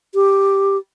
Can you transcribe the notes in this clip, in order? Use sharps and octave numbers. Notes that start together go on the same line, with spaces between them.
G4